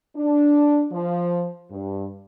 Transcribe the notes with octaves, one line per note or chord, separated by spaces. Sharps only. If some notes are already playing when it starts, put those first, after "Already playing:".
D4
F3
G2